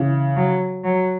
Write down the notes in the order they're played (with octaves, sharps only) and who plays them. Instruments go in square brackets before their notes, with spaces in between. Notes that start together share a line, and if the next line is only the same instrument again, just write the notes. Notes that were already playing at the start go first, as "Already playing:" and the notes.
Already playing: [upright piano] C#3 E3
[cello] F#3
F#3